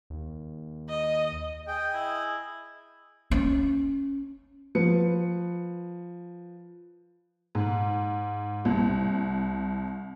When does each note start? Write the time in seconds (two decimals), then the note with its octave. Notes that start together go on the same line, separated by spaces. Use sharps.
0.10 D#2
0.89 D#5
1.67 G#4 D#5 G5
1.94 E4
3.31 C#4
4.75 F3 B4 C#7
7.55 G#2
8.65 C2